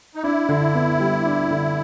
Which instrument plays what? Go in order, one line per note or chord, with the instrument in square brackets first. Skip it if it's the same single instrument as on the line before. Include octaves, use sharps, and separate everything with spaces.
[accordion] D#4
[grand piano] D4 [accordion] E4
[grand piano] D3
B3
G3
D4
D3